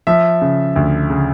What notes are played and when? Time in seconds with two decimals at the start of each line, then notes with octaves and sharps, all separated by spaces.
0.07 F3 E5
0.41 C#3
0.76 D2
1.10 C#3